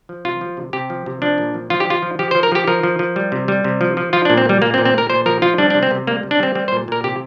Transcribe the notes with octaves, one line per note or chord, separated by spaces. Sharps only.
F3
C3 F4
F3
C3
C3 G4
F3
C3
F3 D4
A#2
F3
F3 F4
G4
F3 F4
F3
F3 G4
C5
F3
A#4
F3 G4
F3 A#4
F3
F3
G3
C3
G3
C3
F3
F3
F3 F4
D4
A#2
C4
A#2 G3
A#2 A#3
C4
A#2
C4
A#2 A#4
A#2 C5
F3 A#4
F3 F4
G3 D4
D4
C3
C4
C3
G3 A#3
C3
D4
G3 C4
G3 C4
C5
A#2
A#2 A#4
C3 G4